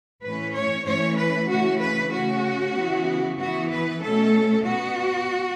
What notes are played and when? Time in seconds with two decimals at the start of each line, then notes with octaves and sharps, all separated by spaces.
0.22 A2 E3 C#4 B4
0.54 C#5
0.86 E3 A3 C#4 C#5
1.18 B4
1.49 C#3 E3 A3 C#4 F#4
1.81 B4
2.12 C#3 A3 C#4 F#4
2.75 C#3 E3 B3
3.38 E3 B3 F#4
3.70 B4
4.01 B2 A3 C#4 A4
4.65 B2 B3 F#4